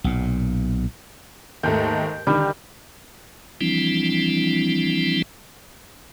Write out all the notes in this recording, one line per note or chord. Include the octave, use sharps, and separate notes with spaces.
B1 A#2
D#2 G#2 A3 G5
D3 D#3 G3
E3 F3 G3 C4 D4 E4